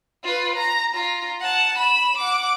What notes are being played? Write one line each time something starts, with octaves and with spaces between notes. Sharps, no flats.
F4 B4
A#5
F4 A#5
F#5 A5
B5 E7
F#5 D6